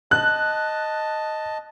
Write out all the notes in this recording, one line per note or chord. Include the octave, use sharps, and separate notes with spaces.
D#5 A5 F#6